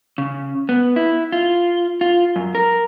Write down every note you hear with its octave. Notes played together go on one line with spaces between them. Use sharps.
C#3
B3
E4
F4
F4
F#2
A#4